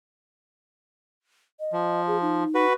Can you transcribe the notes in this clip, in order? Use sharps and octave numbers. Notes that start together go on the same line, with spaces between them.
D#5
F3
G#4
D#4
F#4 B4